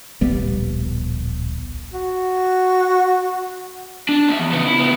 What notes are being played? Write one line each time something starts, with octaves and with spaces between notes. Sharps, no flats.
D1 A#1 G3 B3
F#4
D4
D#2 E5
E2
C#3 B3
E4
C#3 B3